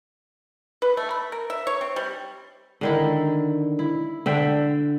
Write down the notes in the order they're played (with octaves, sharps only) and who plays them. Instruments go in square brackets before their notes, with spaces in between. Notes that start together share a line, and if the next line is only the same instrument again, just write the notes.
[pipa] B4
A3
B5
A#4
E5
C#5
C4
G3
[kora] D3 D#3 E4
E4
D3 E5 G5